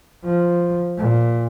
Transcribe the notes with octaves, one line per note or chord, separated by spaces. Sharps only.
F3
A#2